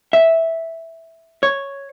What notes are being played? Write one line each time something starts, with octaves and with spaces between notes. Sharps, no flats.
E5
C#5